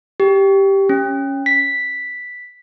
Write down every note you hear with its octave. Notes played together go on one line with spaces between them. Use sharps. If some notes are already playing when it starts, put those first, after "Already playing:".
G4
C#4
B6